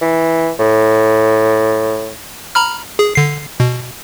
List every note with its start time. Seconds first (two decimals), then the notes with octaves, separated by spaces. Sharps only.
0.02 E3
0.59 A2
2.55 A#5 B5 F6
2.99 G#4
3.15 D3 C7
3.60 B2